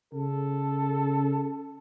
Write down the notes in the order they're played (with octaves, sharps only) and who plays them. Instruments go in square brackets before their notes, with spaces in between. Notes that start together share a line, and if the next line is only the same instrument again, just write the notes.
[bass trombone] C#3 [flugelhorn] A4